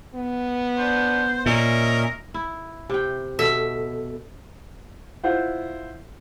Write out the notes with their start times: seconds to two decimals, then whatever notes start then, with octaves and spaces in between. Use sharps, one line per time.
0.15 B3
0.78 D4 C5
1.46 A#2 C#4 A#4 D#5 E5
2.34 E4
2.90 C3 G5
3.39 B2 A4 E5
5.24 E4 F4 C5 F5 F#5